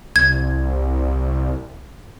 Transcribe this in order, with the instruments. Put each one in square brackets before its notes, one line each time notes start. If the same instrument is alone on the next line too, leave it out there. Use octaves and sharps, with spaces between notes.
[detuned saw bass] C2 [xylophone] G#6